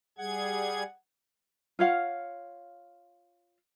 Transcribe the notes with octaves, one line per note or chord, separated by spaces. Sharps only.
G3 G#4 F#5 G#6
F4 C#5 F5 F#5